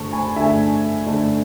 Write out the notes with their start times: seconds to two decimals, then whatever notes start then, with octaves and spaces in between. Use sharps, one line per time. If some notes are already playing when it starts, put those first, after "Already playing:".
Already playing: D3 A3 A5 C#6
0.13 G#5 B5
0.36 D3 A3 E5 G#5
1.07 D3 A3